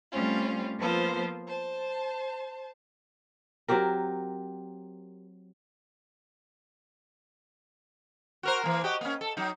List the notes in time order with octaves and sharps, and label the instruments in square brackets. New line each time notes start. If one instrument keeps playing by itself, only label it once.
[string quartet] G3 A3 C4 C#4 F4
F3 A#3 B3 F4 A4 C5
C5 A5
[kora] F#3 C4 G4 A#4
[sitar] F#4 A#4 C5
E3 A#3
F#4 G4 D#5
A#3 C#4
A4
F#3 D#4